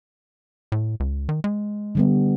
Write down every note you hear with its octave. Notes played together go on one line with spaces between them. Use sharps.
A2
C#2
D#3
G#3
D3 G3 B3